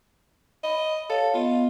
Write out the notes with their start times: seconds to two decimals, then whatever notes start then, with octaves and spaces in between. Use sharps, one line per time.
0.64 D#5 B5
1.10 A4 C#5 F5
1.34 B3 F4 D#5